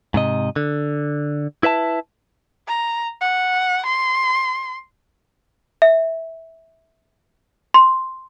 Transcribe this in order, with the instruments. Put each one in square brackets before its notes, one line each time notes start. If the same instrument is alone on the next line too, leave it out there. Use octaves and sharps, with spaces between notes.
[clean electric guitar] G#2 C3 D#5
D3
E4 B4 E5 A5
[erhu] A#5
F#5
C6
[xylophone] E5
C6